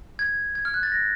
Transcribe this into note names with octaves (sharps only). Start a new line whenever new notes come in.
G#6
G#6
F6
F#6
A6
A#6